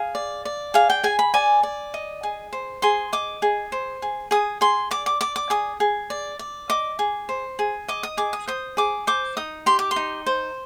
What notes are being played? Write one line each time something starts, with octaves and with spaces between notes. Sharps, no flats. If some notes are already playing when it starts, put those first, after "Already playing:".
Already playing: G#4 F5
D5
D5
G#4 F5
G5
G#4 G#5
B5
D5 G#5
D5
D#5
G#4
C5
G#4 C6
D#5 D6
G#4
C5
G#4
G#4 D#6
G#4 C6
D5 D6
D6
D5 D6
D6
G#4 D#6
G#4
D5
D5
D#5 D6
G#4
C5
G#4
D#5 D6
D#6
G#4 D6
D#6
C5 D#6
G#4 D6
C5 D6
D#4 D#6
G4 C6
D6
C6
D#4
C5